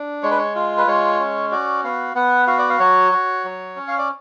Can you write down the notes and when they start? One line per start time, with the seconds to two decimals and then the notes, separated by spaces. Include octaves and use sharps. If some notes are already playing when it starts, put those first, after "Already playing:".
Already playing: D4
0.23 G#3 C#5
0.31 B4
0.38 C#5
0.55 F4
0.78 B4
0.87 G#3 C#5
1.20 C#4
1.51 F#4 D5
1.84 B3 F5
2.15 B3 F#5
2.47 F#4 F5
2.59 D5
2.70 F5
2.80 F#3 C#5
3.12 F#4
3.44 F#3
3.76 C#4
3.88 F5
3.98 D5